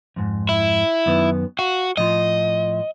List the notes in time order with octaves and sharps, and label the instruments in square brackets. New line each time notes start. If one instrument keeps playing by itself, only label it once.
[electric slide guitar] F2 G#2
[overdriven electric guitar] E4
[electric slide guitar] F#2 D#3 B3
[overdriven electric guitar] F#4 [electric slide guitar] F5
[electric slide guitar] A2 F3 F4 [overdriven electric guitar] D#5